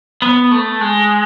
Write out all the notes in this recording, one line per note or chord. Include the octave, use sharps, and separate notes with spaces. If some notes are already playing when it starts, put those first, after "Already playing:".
B3
A3
G#3